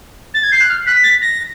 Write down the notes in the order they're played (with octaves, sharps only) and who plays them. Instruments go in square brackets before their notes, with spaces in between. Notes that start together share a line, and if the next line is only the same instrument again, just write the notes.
[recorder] A6
G#6
[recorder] G6 [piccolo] C7
[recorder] F#6
F6
[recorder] F#6 [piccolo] B6
[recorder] A6
A#6